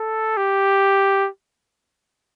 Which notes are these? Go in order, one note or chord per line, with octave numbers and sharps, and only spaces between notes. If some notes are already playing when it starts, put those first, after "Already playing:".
Already playing: A4
G4